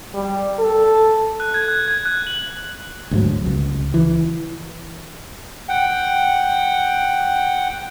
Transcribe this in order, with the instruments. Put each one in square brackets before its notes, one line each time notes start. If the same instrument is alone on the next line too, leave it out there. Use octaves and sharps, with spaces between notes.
[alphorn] G3
A4
[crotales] F#6
G#6
F#6
G#6
F#6
F#7
[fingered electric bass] D2 G#2 F#3
C#2
E3
[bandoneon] F#5 G5